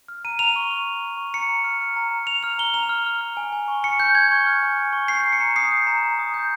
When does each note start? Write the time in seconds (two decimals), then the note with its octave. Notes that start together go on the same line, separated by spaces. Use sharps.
0.08 F6
0.24 A#5 D#7
0.39 A#5 F7
0.56 C#6
0.70 F6
0.87 A#5
1.03 A#5
1.17 C#6
1.34 A#5 C#7
1.49 A#5
1.64 F6
1.81 F6
1.96 A#5
2.11 A#5
2.27 F6 F7
2.43 F6 F7
2.58 A#5 G7
2.74 A#5 F7
2.89 F6
3.06 F6
3.21 F6
3.37 G#5
3.52 G#5
3.68 C#6
3.83 F6 C#7
4.00 G#5 G6
4.15 G#5 G#6
4.31 C#6
4.47 F6
4.63 G#5
4.78 G#5
4.93 C#6
5.08 G6 C7
5.25 A#5
5.33 C#7
5.40 A#5
5.56 D#6 C7
5.71 G6
5.87 A#5
6.03 A#5
6.19 D#6
6.34 G6